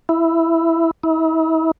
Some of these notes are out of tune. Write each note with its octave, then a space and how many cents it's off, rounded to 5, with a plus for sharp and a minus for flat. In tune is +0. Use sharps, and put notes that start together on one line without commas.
E4 +5
E4 -40